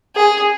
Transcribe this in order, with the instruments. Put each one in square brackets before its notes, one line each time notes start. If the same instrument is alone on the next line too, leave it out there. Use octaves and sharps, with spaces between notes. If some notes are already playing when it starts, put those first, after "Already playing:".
[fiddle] G#4